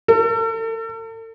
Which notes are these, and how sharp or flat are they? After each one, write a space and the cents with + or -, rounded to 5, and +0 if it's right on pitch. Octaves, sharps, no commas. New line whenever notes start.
A4 +40